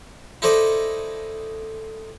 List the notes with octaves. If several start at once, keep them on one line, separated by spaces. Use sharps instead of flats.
D#4 E4 A4 C5 D5 D#5